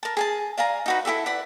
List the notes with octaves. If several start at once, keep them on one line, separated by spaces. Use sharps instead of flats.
A#4 A5
G#4 G#5 A5
D5 F5 G#5 A#5
D#4 F#4 B4
E4 G4 A4 E5
B4 D5 F#5 B5